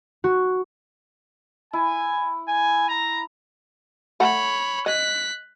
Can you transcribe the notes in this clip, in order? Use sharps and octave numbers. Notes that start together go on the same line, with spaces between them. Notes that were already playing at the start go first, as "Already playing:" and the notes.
F#4
E4 G#5
G#5
A#5
A3 A4 C#5 F#5 B5
D#5 F#6 B6